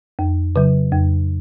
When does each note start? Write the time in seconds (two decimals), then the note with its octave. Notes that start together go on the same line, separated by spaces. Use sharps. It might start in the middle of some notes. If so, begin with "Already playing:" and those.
0.19 F2
0.56 C#3 F#3
0.92 F2